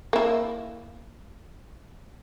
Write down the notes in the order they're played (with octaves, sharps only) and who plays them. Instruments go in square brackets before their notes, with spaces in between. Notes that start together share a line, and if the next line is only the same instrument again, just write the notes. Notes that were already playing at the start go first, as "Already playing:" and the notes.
[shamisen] A#3 E4